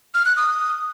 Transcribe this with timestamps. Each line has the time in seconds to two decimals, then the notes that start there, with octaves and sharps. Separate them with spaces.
0.14 F6
0.26 F#6
0.37 D#6